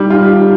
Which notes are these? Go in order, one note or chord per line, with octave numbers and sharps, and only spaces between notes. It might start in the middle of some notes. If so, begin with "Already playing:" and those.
Already playing: G3 D#4 G4
F4